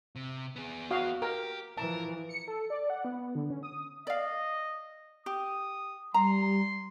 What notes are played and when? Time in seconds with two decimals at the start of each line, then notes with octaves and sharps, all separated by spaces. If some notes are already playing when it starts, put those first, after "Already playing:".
0.15 C3
0.56 B3 G#4
0.91 F#4 F5 D#6
1.22 G4 A#4
1.78 E3 F3 A#4 A5
2.29 C#7
2.48 A4
2.70 D5
2.90 F#5
3.05 B3
3.35 D3
3.50 C#4
3.63 D#6
4.07 D5 D#5 F5
5.26 G4 D#6
6.14 G3 A#5 C6